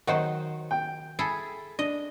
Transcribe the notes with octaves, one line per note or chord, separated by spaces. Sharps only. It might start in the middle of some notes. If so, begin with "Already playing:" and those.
D#3 F#3 C5 D#5 F#5
G5
E4 G#4 A4
D4 D#5